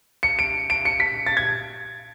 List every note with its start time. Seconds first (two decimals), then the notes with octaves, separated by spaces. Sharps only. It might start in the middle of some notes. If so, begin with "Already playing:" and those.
0.23 C#7
0.39 D7
0.70 D7
0.85 C#7
1.00 B6
1.26 A6
1.37 G#6